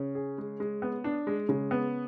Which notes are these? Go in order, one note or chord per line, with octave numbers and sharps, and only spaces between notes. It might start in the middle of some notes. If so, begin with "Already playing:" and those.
Already playing: C#3 C#4
G#4
G#3
G#3
B3
D4
G#3
C#3 G#3
B3